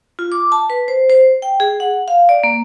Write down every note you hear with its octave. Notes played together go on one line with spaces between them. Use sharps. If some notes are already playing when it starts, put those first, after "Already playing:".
F4
D6
A5
B4
C5
C5
G5
G#4
F#5
F5
D5
A#3